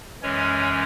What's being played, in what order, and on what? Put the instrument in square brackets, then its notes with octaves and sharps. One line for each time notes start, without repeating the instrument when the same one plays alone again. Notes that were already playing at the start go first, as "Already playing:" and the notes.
[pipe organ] F#2 E3 G#3 C#4 C#5